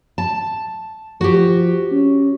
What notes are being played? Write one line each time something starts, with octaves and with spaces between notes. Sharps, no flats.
A5
F3 F#4 G4
C#4